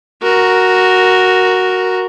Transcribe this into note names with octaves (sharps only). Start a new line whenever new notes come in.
F#4 A#4